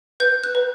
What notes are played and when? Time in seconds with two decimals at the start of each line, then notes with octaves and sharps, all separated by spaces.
0.20 B4 G6
0.44 F#6
0.55 B4